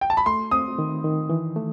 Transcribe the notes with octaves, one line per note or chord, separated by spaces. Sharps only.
G5
A5
B5
A3 C6
C4 D#6
D#3
D#3
E3
A3